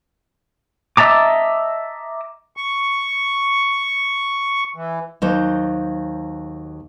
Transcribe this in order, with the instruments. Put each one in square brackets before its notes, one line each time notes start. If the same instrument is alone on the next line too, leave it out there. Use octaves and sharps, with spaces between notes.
[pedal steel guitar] D#5 E5 A5 A#5 D6
[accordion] C#6
E3
[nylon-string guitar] D#2 F#3 C5